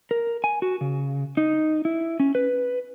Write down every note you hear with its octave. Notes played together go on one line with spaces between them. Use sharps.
A#4
G#5
F#4
C#3
D#4
E4
C#4
B4